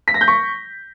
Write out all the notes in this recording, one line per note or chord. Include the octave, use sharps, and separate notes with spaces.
B6
A#6
G6
C#6